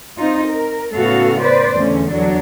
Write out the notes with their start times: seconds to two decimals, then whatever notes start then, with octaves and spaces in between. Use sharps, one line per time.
0.17 C4 D#4 F4
0.48 A#4
0.94 A2 C#3 B3 F#4 A4 F5
1.40 B4 C5 D5
1.74 E2 D3 A3 C#4
2.11 E2 F#3 D4